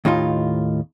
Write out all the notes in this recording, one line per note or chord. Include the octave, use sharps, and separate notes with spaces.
D#2 A2 D#4 F4